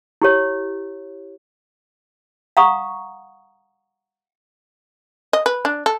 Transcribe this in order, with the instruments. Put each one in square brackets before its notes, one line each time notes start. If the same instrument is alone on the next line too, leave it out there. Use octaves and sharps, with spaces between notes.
[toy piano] E4 G4 C#5
F5 F#5 A#5 C#6 D#6
[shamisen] D#5
B4
D4
A4